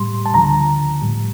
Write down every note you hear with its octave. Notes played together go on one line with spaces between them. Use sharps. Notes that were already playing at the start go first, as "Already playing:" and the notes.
Already playing: A2 G3 C6
A5
D2 D3 F3 A#5
A2 G3